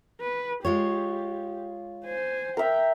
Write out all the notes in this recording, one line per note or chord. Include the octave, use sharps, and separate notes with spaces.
B4
G#3 F4 G4 C#5
C5 G#5
A#4 E5 G5